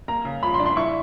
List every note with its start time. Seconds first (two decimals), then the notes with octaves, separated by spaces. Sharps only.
0.08 A#3 A#5
0.25 C#3
0.43 F3 B5
0.54 C6
0.60 D4
0.66 C6
0.76 E4 C#6